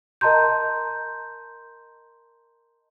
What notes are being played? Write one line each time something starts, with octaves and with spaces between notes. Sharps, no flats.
A#4 D#5 A5 A#5 C6 G6